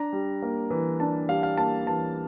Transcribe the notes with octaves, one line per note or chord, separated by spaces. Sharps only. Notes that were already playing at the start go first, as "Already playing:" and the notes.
Already playing: D4 A#5
G3
A#3
E3
D4 A5
G3 F5
F5
A#3 A5
E3 A5